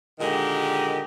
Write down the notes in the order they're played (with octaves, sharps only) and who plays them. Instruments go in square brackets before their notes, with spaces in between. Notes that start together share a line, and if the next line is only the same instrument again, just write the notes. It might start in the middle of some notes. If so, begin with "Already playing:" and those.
[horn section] A#2 D3 D#3 G#3 G4 D#5